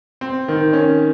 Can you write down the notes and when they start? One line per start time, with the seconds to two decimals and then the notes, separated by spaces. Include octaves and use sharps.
0.21 C4
0.48 D#3
0.73 C#4